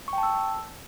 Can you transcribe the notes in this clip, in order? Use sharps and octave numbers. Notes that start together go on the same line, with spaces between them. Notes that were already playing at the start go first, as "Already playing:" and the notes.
C#6
G5
A5
E6